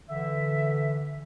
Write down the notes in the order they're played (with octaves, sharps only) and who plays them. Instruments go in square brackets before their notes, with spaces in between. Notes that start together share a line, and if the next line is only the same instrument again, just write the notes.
[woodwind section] D3 E3 E5